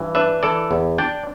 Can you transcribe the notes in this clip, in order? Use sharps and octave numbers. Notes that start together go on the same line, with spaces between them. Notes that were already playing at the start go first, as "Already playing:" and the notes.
Already playing: G2 E3
D4 B4 E5
E3 A4 D5
E2
D4 D5 G5